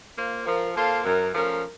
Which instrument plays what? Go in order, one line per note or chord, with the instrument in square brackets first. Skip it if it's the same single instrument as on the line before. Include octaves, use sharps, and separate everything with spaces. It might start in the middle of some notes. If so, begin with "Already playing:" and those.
[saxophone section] A#3 F4 C5
[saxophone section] F3 [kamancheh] A#4
[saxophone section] A#3 F4 C5 [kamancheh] A4
[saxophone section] F#2 [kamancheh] A#4
[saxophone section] F3 A3 C#4 [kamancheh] A#4